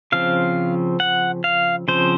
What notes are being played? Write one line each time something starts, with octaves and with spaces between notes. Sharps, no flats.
C#3 F3 C4 F5
F#5
F5
C#3 F3 C4 C5